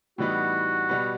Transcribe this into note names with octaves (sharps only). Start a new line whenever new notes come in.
A2 E3 G3 B3 D#4 F#4
B2 G3 B3